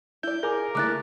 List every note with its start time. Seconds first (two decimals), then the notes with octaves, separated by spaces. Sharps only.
0.23 E4 D5 G6
0.43 F4 G#4 A#4 G#5 D6
0.75 C#3 A3 A#3 E4 D6 F#6 A6